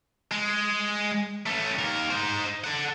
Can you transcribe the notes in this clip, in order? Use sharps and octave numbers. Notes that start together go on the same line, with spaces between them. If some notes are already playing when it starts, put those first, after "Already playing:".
G#3
A3 C#4
D#2 A#4
D#4 C5
A4 F#5